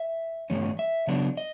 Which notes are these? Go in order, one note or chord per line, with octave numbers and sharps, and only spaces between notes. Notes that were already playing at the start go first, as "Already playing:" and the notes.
Already playing: E5
G2 E3 A3 C#4
E5
C#3 F#3 B3 D4
D#5